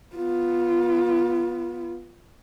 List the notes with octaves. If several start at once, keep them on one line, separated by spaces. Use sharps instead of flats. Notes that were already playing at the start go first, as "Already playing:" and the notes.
B3 F4